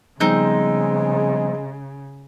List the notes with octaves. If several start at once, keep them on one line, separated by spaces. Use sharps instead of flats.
C#3 F3 G3 G#3 B3 C4 D#4 G6